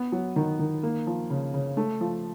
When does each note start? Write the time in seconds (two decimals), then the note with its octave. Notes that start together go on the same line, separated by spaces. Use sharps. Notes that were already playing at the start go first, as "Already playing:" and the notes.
Already playing: B3
0.12 F#3
0.36 D#3
0.59 D#3
0.83 A#3
1.07 F3
1.30 C#3
1.54 C#3
1.77 A3
2.01 F3